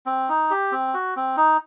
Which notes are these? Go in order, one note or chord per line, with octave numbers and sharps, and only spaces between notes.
C4
D#4
G4
C4
F#4
C4
D#4